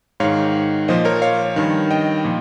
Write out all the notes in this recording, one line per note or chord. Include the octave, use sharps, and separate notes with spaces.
G#2 D#3 C#5 F5
A#2 F3 C5 D#5
A#4 C#5
C#5 F5
G2 D#3
D#5 G5
A#2 F3